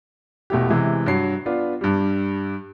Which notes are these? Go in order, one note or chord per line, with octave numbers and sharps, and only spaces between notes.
E1 B2 A3 E4 G4
C3 E3 G#3
G2 F#3 C7
B3 D4 F4
G2 G3